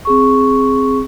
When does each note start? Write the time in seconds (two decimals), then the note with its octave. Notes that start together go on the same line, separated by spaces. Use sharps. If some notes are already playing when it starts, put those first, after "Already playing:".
0.05 C4 G#4 C#6